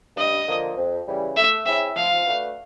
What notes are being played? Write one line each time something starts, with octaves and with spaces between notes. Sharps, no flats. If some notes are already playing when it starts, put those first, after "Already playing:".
G2 D#5
D3 F3 A#3
F2
C#3 E3 G3
A3 E5
C4 E4 G#4 C#5 E5
F3 F5
A3 D4 F#4 B4